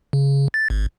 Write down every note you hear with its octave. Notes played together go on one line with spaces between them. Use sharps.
C#3
A6
G#1